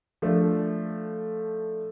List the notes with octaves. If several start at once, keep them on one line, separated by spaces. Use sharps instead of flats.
F3 A3 D4